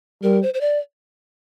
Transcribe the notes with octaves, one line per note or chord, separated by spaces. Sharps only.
G3 A#4
C5
C5
D5